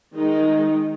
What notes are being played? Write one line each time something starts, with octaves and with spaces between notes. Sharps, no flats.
D#3 G#3 D#4